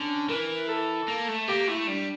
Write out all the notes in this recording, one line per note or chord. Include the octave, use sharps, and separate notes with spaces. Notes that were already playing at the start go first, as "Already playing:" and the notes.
Already playing: D3 C#4
E3 A#4
A4
A#3
A3
A#3 G4
A3 E4
G3 D4